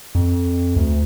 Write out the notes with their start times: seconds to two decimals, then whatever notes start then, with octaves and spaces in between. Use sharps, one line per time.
0.15 F2
0.76 D2